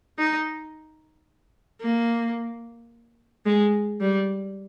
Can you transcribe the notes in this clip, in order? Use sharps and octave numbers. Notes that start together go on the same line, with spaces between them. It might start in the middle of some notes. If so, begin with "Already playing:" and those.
D#4
A#3
G#3
G3